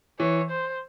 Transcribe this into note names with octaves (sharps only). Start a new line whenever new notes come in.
E3 C#5
C5